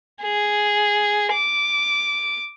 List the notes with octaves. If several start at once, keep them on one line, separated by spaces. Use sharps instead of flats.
G#4
D6